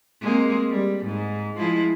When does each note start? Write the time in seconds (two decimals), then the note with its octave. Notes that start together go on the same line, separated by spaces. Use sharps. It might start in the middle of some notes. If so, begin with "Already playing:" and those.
0.22 G#3 A#3 C4
0.69 G3
1.05 G#2
1.58 F3 G#3 E4